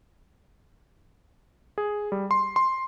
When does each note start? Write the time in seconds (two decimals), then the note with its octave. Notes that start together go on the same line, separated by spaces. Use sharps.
1.78 G#4
2.12 G3
2.31 C6
2.56 C6